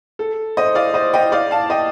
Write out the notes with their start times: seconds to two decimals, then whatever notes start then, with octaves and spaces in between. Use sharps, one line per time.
0.19 A4
0.57 C5 D#5
0.75 D5 F5
0.94 C5 D#5
1.13 D#5 G5
1.32 D5 F5
1.51 F5 A5
1.70 D#5 G5